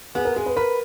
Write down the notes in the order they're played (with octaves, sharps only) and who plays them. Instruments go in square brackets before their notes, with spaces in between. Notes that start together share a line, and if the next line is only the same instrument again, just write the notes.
[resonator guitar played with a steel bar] B3 [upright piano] G#4
[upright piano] A#4
[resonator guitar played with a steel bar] G#3 [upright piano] G#4
[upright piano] B4
[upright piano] A#4 [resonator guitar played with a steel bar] B4